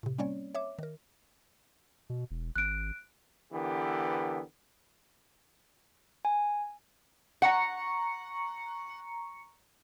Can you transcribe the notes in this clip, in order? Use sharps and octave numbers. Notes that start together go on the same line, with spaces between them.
A2 C3
G3 A#3 C4 C#4 C#5 D5
C#5 E5 D6
D#3 A#4
B2
E1
G#1 F#6 D7
D3 E3 B3 G4 A#4
G#5
F#5 A#5 C#6 C#7